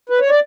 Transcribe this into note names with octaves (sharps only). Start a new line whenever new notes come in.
B4
C#5
D5